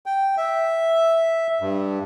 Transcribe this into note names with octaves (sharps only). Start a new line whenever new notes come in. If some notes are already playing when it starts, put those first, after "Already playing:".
G5
E5
G2